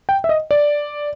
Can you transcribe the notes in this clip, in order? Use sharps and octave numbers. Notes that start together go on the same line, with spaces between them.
G5
E5
D#5
D5